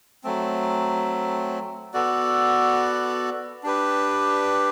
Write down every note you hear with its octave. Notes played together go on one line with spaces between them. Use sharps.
F#3 A3 C4
B3 F#4 A4 D5
D4 G4 B4